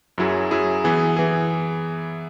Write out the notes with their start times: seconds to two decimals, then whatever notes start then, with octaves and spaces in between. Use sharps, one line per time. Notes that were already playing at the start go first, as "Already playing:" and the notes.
0.18 F#2 F#3 E4 G#4
0.51 F#2 F#3 E4 G#4
0.84 E3 B3 G#4
1.17 E3 B3 G#4